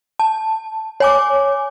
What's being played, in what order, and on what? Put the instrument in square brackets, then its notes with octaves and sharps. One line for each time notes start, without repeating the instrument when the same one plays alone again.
[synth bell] A5
C#5 G#5 D6